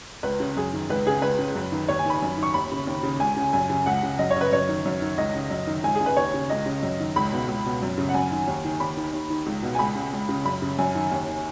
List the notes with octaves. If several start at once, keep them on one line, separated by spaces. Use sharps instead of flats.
C#2 B4
C#3
F#2 G#4
D#3
C#2 B4
C#3 G#4
C#2 B4
C#3
F#2
D#3
D#2 C#5
G#5
D#3 B5
F#2
D#3
C#6
D#2 B5
C#3
D#2
C#3
C#2 G#5
C#3
F#2 G#5
C#3
C#2 F#5
C#3
F#2 D#5
C#5
C#3 B4
F#2 C#5
D#3
F#2
D#3
C#2 D#5
C#3
F#2
D#3
C#2 G#5
G#4
C#3
B4
D#2 C#5
C#3
C#2 D#5
C#3
F#2
D#3
C#2 B5
B2
C#2
B2
F#2
C#3
F#5
F#2 G#5
D#3
D#2
D#3
D#2 B5
D#3
D#2
D#3
C#2
B2
G#5
C#2 B5
C#3
C#2
C#3
F#2 B5
C#3
F#2 G#5
D#3
D#2
D#3